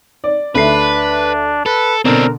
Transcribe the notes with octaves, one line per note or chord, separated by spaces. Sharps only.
D5
D2 A3 D4 B4 C7
A4 B4
B2 D3 C4 D4 A#4